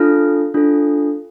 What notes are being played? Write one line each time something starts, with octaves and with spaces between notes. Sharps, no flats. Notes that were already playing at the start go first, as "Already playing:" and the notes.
Already playing: D4 F4 A4 F6
D4 F4 A4